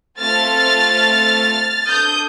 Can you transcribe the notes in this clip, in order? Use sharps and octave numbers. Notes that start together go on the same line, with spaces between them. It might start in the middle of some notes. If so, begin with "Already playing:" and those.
A3 C4 F4 A4 F6 A6
D4 A4 D#6 G6